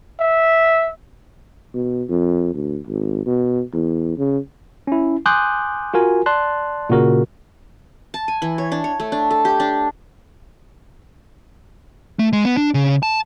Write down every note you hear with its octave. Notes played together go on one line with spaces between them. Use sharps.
E5
B2
F2
D2
G#1
B2
E2
C#3
C#4 E4
G#5 C6 D6 D#6 F#6 G6
F4 F#4 A#4 G#5
D5 A5 C6 F#6
A#2 C#3 F#4 A#4
A5
G#5
E3
C#5
D4
C#5
A3
D4
A4
G4
D4
A3
G#3
B3
D4
C#3
A5